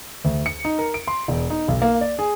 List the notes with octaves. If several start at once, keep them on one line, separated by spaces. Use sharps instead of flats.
D2
C#7
D#4
A#4
D7
C6
E1
D#4
B1
A#3
D5
G#4